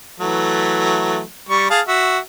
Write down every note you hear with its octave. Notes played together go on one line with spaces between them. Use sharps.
E3 F#3 A3
G3 C#6
G#4 F5 A5
F#4 E5